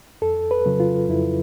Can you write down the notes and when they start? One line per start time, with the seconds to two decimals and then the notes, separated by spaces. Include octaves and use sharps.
0.22 F2 A4
0.51 B4
0.66 C#3 F#3
0.80 F4
1.09 F2 E4